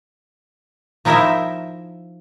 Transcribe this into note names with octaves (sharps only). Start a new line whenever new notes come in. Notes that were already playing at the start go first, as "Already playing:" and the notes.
F3 D#4 E4 A#4 C5 E5